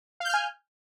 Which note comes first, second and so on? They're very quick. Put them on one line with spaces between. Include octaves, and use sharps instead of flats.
F5 G6 F6 G#5